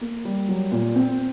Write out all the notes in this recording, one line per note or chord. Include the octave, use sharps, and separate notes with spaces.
A#3
G3
F#3
A#2
C4